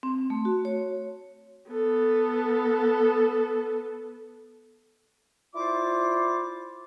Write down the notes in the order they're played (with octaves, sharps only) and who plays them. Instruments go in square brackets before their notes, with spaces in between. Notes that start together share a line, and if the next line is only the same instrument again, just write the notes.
[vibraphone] C4
A3
F#4
C#5
[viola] B3 A4
[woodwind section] E4 F4 C5 D5 D6